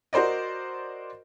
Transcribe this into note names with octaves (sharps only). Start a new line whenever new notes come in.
F#4 A#4 C5 D5 D#5